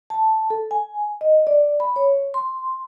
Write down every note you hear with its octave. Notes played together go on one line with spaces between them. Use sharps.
A5
A4
G#5
D#5
D5
B5
C#5
C6